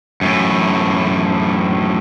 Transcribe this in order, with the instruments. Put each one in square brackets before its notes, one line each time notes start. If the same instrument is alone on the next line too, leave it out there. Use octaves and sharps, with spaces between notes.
[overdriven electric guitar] F#2 A2